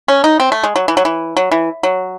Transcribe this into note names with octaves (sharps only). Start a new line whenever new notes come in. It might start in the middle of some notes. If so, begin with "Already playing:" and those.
C#4
D#4
C4
A3
G#3
F#3
E3
F#3
E3
F#3
E3
F#3